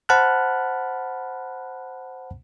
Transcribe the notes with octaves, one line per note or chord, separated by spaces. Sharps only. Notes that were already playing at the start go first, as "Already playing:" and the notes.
C5 F#5 A5 B5 F6 F#6